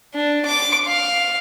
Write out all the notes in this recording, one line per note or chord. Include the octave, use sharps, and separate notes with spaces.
D4
D6
F5